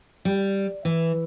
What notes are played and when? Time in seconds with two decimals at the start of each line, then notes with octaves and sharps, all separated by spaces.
0.25 G3
0.85 E3